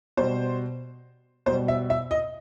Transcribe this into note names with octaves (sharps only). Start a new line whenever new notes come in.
B2 G3 C5
B2 G3 C5
E5
E5
D#5